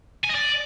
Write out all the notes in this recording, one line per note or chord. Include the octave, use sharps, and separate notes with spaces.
G#5
D#5
D5